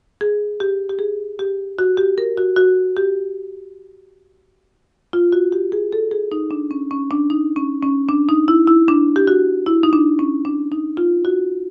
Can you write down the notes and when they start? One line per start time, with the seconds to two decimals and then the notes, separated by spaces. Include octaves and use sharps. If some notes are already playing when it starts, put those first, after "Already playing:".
0.21 G#4
0.60 G4
0.89 G4
0.99 G#4
1.39 G4
1.79 F#4
1.97 G4
2.18 A#4
2.37 F#4
2.57 F#4
2.97 G4
5.13 F4
5.32 F#4
5.52 G4
5.72 G#4
5.93 A4
6.11 G#4
6.32 D#4
6.51 D4
6.71 C#4
6.91 C#4
7.11 D4
7.30 D#4
7.56 C#4
7.83 C#4
8.09 D4
8.29 D#4
8.48 E4
8.67 E4
8.88 D4
9.16 G4
9.27 F#4
9.66 E4
9.83 D#4
9.93 D4
10.19 C#4
10.45 D4
10.72 D#4
10.97 F4
11.25 F#4